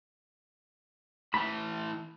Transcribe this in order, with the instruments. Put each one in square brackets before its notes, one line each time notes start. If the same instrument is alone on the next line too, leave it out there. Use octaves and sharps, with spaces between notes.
[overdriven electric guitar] A2 E3 [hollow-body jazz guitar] B5